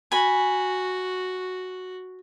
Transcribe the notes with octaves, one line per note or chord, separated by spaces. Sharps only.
F#4 G#5 B5